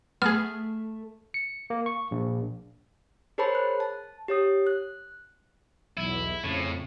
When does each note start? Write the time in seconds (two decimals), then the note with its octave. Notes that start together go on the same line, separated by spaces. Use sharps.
0.22 A3 B3 G#4 F6
1.34 C#7
1.70 A#3
1.86 C#6
2.11 A#1
3.38 G#4 A#4 C5 C#5 A5 B5
3.55 F#6
3.80 A5
4.28 G4 C#5 D#6
4.67 F#6
5.97 B1 E2 E4
6.44 F2 A2 C#3